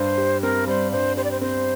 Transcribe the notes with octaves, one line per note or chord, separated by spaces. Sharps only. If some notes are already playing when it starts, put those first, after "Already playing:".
Already playing: G2 C5
G4
C4 A#4
G3 C5
G2 C5
G4 C5
D5
C5
C4 C5